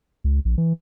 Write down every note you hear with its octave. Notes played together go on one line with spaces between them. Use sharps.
C#2
A#1
E3